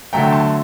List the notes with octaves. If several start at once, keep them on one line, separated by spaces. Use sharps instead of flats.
D3 F#3 A3 G5 A#5
A5 C6